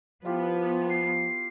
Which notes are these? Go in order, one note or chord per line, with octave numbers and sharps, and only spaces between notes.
F3 B3 E4 F4 G4
C7